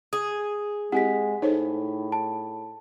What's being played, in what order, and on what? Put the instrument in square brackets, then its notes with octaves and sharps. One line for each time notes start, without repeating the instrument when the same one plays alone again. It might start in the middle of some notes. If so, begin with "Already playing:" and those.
[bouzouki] G#4 [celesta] D#6
[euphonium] G#3 [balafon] C4 E4 G4 [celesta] F#5 G#5 B6
[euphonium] A2 [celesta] D#4 [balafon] A4 C5 C#5
[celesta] A5